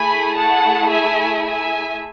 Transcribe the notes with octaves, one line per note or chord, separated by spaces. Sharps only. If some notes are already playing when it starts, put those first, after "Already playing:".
Already playing: A3 E4 G#4 G#5 B5
F#5 A5
E5 G#5
E5 G#5